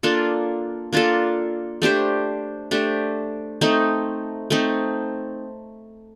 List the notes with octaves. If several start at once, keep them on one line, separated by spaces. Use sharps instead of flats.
A#3 D4 F4 A4
A#3 D4 F4 A4
A3 D4 G4 C5
A3 D4 G4 C5
A3 C4 D#4
A3 C4 D#4